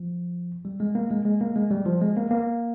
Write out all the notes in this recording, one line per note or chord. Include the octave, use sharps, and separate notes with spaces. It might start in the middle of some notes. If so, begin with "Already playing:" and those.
Already playing: F3
G3
G#3
A#3
G#3
G#3
A#3
G#3
G3
F3
G#3
A#3
A#3